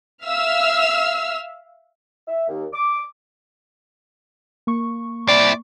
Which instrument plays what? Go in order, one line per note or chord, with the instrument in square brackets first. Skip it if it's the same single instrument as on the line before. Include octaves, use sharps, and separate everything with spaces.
[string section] E5 F5 E6 F6
[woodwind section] E5
D#2
D6
[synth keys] A#3 C#6
[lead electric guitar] C4 E4 [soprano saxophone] D5